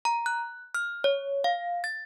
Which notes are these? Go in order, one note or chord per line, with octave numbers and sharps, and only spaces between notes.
A#5
F#6
F6
C#5
F5
A6